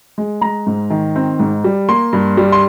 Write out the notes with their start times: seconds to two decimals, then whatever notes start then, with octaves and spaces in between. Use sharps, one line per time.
0.18 G#3
0.41 G#3 A#5
0.67 G#2
0.90 D#3
1.16 C4
1.39 G#2
1.64 G3
1.89 A#3 C6
2.13 G2
2.37 G3
2.52 C6